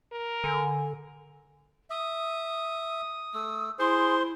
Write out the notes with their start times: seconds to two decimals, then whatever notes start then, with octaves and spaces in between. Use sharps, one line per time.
0.12 A#4
0.44 D3 G#5
1.90 E5 D#6
3.34 A3 E6
3.79 E4 G#4 C5 C6